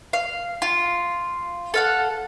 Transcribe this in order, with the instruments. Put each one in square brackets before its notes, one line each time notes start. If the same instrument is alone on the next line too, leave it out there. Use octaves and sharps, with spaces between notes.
[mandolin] F5
F4
A4 F5 F#5